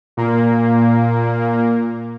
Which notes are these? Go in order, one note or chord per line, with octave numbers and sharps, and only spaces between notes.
A#2 A#3